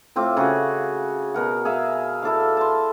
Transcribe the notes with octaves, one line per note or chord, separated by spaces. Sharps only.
A2 C4 F4 D6
C#3 F#4 G#4
B2 A#4 F#5
G#4 E5 F5
E4 A4 D5 F5
A5 C6